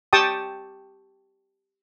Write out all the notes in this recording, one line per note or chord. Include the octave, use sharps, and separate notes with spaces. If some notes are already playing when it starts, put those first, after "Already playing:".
G4 G5 A5 C#6 D#6